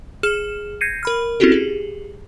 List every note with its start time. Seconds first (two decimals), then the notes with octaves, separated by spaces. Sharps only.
0.23 G#4 F6 E7
0.81 G6 G#6 A#6 C7 C#7 D#7
1.03 A#4 B5 F6
1.40 C4 C#4 E4 F#4 G4 A4
1.52 G4 G#4